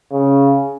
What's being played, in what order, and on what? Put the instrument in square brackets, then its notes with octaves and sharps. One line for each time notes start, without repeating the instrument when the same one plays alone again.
[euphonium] C#3